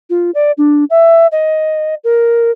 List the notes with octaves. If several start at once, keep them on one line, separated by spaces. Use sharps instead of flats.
F4
D5
D4
E5
D#5
A#4